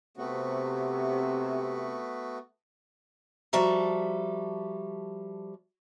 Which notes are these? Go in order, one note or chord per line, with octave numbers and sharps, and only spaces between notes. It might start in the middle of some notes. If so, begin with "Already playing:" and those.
C3 A3 B3 F#4
F3 G3 F#4 A4 E5 A#5